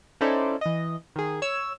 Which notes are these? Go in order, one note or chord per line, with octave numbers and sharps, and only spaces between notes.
C#4 D#4 E4 A4 C5 D5
E3 D#5
D#3 G#4
C#5 E6